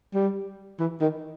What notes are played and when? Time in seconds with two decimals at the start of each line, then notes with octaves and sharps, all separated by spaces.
0.14 G3
0.80 E3
1.01 D#3